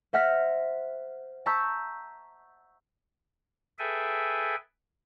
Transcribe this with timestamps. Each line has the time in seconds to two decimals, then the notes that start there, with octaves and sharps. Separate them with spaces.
0.13 C5 E5 F#5 F6 A#6 B6
1.46 A5 A#5 C#6 E6 G6 B6
3.79 G#4 A4 B4 E5 G5 G#5